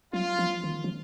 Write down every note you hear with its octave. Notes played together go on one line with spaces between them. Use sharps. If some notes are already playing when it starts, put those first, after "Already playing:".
F#3 F4
F3
D#3
F3